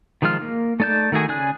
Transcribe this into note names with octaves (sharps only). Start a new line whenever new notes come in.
D#3 F3 G#3 F4 F6
A#3
A3 D#4 D5 A5 G6
D#3 A3 F#4 G#4 G#5
C#3 G#4 D5 G#5 F#6